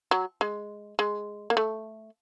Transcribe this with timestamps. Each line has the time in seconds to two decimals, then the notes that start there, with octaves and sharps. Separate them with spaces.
0.11 F#3
0.41 G#3
0.99 G#3
1.50 A#3
1.57 A3